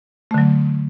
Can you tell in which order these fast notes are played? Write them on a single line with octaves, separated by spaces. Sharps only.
A3 D3 F#3